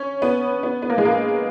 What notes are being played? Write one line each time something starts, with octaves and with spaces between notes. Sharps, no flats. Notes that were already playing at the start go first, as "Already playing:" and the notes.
Already playing: C#4
B3
B3
B3
A#3
G#3
A#3